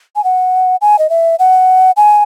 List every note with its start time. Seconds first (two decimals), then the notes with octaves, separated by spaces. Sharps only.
0.16 G#5
0.24 F#5
0.81 G#5
0.99 D#5
1.10 E5
1.39 F#5
1.97 G#5